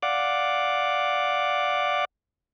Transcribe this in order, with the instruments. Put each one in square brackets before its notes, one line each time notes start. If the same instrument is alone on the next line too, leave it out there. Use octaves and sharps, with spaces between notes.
[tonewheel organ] D5 F5 F#5 D6